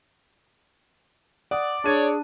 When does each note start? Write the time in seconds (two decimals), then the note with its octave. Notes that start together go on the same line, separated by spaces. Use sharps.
1.51 D5 F#5 D#6
1.84 D4 G#4 C#5 D#7